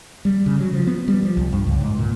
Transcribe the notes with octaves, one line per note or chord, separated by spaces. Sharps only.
G3
C#3
F#3
F3
B3
G3
F3
C2
G2
C#2
G#2
A#2